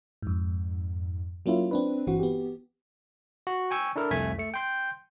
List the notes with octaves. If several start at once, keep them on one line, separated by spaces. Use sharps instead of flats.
F2 G#2
F#3 A#3 C#4 E4 F4
C4 D4 B4
G1 E3 C4 F#4
B3 G4
F#4
G5 G#5 C#6 E6
D4 E4 A4 A#4
C2 F2 A3 G#5 G#6 B6
A3 C#7
G5 C6 G6